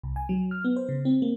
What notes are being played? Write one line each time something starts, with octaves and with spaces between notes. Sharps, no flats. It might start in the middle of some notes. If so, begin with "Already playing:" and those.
C2
G#5
F#3
F6
B3
C5
C#3
C4
A#3